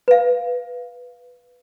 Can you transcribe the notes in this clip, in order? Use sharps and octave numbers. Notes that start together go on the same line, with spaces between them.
B4 F5